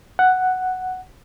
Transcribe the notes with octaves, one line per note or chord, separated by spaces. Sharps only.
F#5